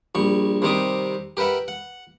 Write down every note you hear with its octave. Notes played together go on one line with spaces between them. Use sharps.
A#1 G3 C#6
C3 D#3 G3 C4 D6 D#6
G4 A#4 B4 E5 F#5
F#5